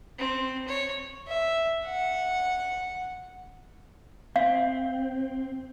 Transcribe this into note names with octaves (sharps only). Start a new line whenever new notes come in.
C4
C#5
E5
F#5
C4 F5